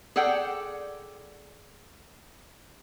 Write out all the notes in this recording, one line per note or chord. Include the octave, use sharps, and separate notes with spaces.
G#4 A4 D5 F#5 G5